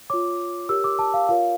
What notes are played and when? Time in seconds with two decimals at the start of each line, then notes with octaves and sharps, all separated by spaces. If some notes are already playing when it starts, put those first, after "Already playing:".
0.10 F4 C#5 D6
0.69 G4 A#4 C#5 E6
0.84 D6
0.99 A5
1.14 F5
1.29 F4 A#4 C#5 F5